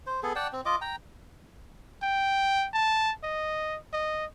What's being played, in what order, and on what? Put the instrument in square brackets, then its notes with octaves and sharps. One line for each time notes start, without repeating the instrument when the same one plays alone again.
[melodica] C5
B3 G#4 A4
D5 F#5 G5 A5
C4
F4 D#5 D6
G5 A#5
[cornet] G5
A5
D#5
D#5